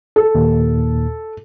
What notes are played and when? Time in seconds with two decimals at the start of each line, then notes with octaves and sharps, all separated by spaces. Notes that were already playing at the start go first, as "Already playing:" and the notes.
0.16 A4
0.35 D#2 A#2